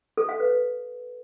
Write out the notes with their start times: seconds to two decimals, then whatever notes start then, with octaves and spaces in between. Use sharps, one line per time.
0.17 A4
0.29 F5
0.40 B4